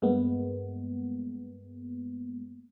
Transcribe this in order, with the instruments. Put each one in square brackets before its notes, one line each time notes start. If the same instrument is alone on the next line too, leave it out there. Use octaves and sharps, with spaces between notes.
[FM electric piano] G2 G#3 A#3 B3